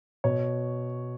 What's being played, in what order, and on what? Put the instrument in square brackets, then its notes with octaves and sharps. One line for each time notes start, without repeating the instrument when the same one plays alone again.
[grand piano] B2 C#5